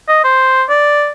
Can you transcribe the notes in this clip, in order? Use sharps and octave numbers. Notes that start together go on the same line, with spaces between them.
D#5
C5
D5